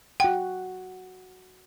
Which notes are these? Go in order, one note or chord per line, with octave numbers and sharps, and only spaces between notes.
F#4 F#5 G5